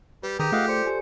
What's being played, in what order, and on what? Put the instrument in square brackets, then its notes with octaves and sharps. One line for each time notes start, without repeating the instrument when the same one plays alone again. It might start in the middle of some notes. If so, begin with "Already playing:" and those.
[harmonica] G3 [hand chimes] B4
[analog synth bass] D#3 [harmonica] G4 [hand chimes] G#4 [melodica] A#5 D#6
[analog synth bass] A3 [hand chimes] F4 A4 [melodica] D#5 F5 F#5
[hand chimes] A4 D5 C#7 [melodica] C5
[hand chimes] G4 G#5